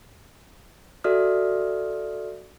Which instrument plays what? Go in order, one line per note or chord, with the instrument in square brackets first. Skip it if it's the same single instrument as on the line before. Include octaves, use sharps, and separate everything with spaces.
[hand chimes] F#4 A4 D5 E5 D#6 F6